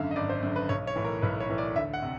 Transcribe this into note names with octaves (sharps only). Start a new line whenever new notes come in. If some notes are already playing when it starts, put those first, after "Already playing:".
Already playing: G#1 F#2 D3 E5 F5
D#5
G#1 D5
C5
F#2 D3
B4
B1 C#5
C#5
A2 E3
A#4
B1 B4
C#5
A2 E3
D5
D2 E5
F#5
C3